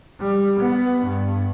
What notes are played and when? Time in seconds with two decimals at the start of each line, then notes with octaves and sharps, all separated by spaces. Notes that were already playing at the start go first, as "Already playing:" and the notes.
0.20 G3
0.60 B3
1.03 G2